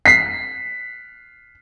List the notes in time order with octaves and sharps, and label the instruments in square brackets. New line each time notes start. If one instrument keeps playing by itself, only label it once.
[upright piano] B6 C7